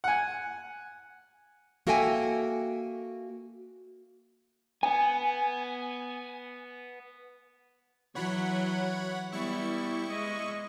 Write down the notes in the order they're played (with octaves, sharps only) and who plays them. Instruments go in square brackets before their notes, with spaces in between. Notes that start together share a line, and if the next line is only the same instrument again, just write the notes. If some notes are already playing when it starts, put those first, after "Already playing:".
[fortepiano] F#5 G#5
[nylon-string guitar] A#3 F#4 A4 E5 G5 G#5
[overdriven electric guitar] B3 [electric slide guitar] G#5
[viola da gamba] E3 F#3 [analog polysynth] C#5 F#5 B5
[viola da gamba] G3 B3 [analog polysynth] E4 C#6
[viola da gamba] G#3 D#5